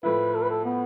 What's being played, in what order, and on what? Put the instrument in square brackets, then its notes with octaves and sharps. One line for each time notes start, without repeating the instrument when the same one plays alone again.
[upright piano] A2 F3 A3 E4 [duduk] B4
[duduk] A4
B4
A4
B3